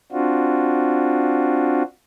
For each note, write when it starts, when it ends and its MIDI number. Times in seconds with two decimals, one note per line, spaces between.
0.12 1.83 60
0.12 1.83 62
0.12 1.83 65
0.12 1.83 66